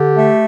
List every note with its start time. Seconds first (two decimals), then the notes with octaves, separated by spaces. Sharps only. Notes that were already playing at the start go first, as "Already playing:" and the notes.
Already playing: D3 G4
0.15 A3